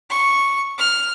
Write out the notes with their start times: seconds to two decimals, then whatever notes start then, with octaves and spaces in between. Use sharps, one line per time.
0.10 C#6
0.78 F6